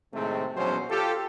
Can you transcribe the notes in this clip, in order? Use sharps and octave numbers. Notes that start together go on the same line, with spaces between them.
A2 C3 D#3 G#3 A3 C4
A#1 E2 B2 F#3 C#4 C5
F4 G4 A4